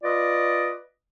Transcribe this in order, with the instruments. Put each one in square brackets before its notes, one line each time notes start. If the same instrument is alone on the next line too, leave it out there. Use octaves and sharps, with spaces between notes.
[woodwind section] F4 B4 D5 D#5